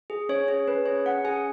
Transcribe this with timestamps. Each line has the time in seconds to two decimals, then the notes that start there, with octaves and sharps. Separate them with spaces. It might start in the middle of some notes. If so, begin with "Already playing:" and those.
0.10 G#4
0.29 C#4 C#5
0.48 G#4 C#5
0.67 C#4 B4
0.86 G#4 C#5
1.06 C#4 F#5
1.24 G#4 G#5